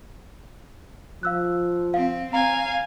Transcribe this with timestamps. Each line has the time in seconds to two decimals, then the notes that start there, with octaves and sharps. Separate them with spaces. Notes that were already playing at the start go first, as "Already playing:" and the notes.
1.23 F3 F5 E6 F#6
1.94 C4 F5
2.33 C4 F5 G#5 A#5